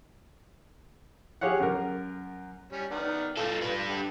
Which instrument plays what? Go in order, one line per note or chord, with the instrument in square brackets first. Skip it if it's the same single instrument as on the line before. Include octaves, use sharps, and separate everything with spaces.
[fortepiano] G4 G#4 C#5 F5 F#5
F#2 A#4
[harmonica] G3 C#4
D#3 B3 D5
[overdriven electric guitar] A#2 A4 [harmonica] F4
[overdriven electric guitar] G3 B4
[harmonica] D3 G4